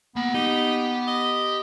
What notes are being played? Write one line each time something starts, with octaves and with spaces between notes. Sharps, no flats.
A#3 B3 G#5
D#4 G4
D#5